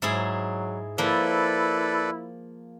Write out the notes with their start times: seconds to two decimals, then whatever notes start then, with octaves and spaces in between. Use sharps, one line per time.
0.02 G#2 F#3 E4 G#4
0.98 F3 A#3 E4 A4 B4 D5